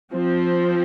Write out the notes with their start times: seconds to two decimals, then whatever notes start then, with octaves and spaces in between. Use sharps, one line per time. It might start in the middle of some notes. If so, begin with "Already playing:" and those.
0.13 F3 C4